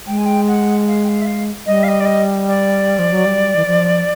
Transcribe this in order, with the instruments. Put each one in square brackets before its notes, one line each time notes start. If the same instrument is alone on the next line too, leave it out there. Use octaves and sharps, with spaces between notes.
[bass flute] G#3 [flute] G5
[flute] G#5
G5
F#5
F5
G5
F5
E5
F5
[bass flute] G3 [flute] D#5
[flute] F5
D#5
D5
D#5
D5
[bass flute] F3
F#3
G3
E3
F3